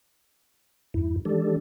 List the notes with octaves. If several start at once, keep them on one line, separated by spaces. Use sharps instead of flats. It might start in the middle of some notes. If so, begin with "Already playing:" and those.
E2 G2 E4
E3 G#3 D4 G4 A4 D5